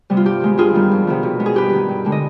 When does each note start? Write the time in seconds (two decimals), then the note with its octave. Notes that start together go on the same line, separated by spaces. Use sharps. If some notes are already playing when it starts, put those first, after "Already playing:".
0.10 C3 G3 B3
0.17 F4
0.25 G2 G4
0.42 D#3 G#3 B3
0.58 G2 F4 G#4
0.74 D#3 G3 B3
0.91 F2
1.07 C3 D#3 B3
1.23 B2
1.40 G#3 B3
1.46 G#4
1.54 G2 G4 B4
1.73 D#3 B3
1.89 G2
2.05 D3 G#3
2.12 D#5